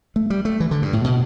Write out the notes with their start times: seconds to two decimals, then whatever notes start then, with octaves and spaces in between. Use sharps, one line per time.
0.16 A3
0.30 G3
0.45 A3
0.60 E3
0.71 D3
0.82 G2
0.93 A2
1.04 B2